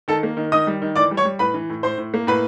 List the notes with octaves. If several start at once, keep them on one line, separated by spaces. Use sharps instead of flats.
D#3 A4 A5
A#3
D#3
D#3 D#5 D#6
G3
D#3
E3 D5 D6
G3
C#5 C#6
G3
A2 B4 B5
E3
A2
A2 C5 C6
A2
A#3
A2 B4 B5